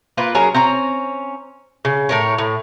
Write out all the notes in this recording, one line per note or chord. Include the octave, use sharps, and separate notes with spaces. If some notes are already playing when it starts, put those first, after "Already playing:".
A#3 F4 B4
F#3 C#4 G#4 A#4
C4 C#4 A#5
C#3
A2 A#4 C#5
A2